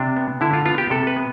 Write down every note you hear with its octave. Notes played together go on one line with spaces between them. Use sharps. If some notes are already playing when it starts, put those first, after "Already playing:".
Already playing: C3 D4
B3
D3 E4
F4
B3 F4
G4
C3 A4
B4
B3